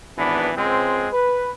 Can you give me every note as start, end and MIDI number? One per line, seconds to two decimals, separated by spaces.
0.17 0.49 32
0.17 0.49 52
0.17 0.49 59
0.17 0.49 62
0.56 1.07 37
0.56 1.07 56
0.56 1.07 60
1.12 1.48 71